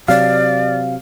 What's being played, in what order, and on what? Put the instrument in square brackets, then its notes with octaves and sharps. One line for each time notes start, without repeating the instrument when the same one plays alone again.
[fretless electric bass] C3 F#3 [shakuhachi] D5 [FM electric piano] F5